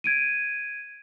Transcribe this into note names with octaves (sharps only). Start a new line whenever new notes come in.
G#6 D7 D#7